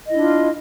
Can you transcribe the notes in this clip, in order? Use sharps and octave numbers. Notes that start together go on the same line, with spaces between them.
D4 E4 F4 D#5